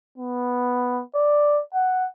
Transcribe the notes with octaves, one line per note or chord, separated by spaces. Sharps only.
B3
D5
F#5